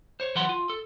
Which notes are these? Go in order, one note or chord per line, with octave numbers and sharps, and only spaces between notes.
C5 C#5
E3 F#3 B4 C#5 F#5 C6
F4
A4